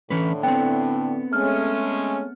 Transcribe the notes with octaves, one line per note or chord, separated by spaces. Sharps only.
A2 D3 E3 C#4 B4
B3 C4 G5
G#3 A3 C#4 F6